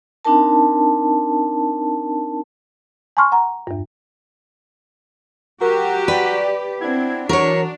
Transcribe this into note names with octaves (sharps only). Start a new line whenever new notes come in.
C4 D4 D#4 A#4 A5
G#5 A5 C6 C#6 F6
F#5 A#5
E2 G2
F#3 F#4 G4 A#4
B4 D5
B3 C4 D4 E4 G#6
E3 F#3 D4 F#4 A#4 C#5